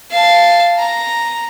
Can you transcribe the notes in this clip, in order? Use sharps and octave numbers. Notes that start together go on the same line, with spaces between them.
F5 A5
A#5